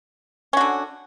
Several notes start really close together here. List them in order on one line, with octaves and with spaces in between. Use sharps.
C#4 F#4 D3